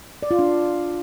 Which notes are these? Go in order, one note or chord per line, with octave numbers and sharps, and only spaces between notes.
D5
F4
D4